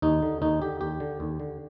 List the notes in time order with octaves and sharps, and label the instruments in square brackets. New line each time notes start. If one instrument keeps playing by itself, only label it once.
[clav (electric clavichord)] D#2 D#4
D3
D#2 D#4
D3 G4
D#2 G4
D3
D#2
D3